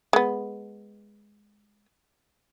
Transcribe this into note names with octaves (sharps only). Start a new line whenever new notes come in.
G#3 B3